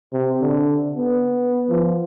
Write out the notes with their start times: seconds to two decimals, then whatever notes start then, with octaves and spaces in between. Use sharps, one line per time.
0.13 C3
0.41 D3
0.97 B3
1.70 F3